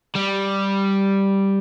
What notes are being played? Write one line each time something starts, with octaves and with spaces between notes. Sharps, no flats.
G3